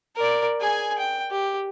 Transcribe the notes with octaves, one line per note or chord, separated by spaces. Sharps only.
A#4 D5
G#4 G#5
G5
G4